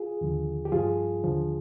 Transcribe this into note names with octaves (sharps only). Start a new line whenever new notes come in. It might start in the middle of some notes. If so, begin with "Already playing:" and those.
Already playing: F4 G#4
D#2 D3 F3
G4
G2 F3 F4 G#4
D#2 D3 F3